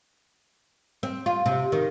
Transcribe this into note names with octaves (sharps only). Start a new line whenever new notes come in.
C4
F4
C3
D#3